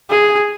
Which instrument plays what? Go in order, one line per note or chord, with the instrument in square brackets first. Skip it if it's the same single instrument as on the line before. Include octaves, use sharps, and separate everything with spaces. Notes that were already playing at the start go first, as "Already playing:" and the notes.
[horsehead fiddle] G#4